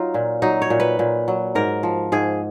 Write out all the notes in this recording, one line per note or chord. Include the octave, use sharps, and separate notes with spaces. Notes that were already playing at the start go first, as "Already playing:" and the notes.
Already playing: F#3 D#4 F4
A#2
F#3 D#4
C#5
A#2
B4
A#2
F#3
G#2 A#4
F3
G#2 G#4